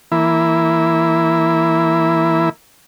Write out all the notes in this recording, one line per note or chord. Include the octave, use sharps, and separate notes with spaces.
E3 A#3 E4 B5